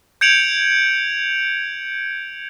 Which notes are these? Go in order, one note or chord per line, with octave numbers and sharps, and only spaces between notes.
G6 G#6 C#7 D7 F7 F#7